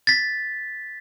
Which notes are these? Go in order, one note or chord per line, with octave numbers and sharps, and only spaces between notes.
A6 B6